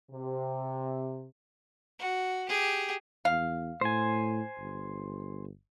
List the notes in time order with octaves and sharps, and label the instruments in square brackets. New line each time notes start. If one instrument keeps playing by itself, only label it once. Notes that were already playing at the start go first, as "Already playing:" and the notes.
[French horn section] C3
[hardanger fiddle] F#4
G4 G#4
[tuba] E2 [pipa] F5
[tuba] A2 [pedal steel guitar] C5 G#5
[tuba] G1